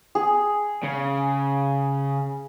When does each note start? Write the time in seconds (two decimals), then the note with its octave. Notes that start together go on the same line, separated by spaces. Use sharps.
0.15 G#4
0.83 C#3